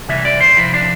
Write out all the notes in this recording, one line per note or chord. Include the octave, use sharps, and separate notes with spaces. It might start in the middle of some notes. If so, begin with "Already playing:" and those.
C3 E3 G3 E5
D5
C5
C3 F3 E4
D4